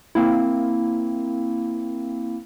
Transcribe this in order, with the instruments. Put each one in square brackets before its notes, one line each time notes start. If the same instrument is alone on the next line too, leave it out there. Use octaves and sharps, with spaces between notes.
[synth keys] A#3 C4 E4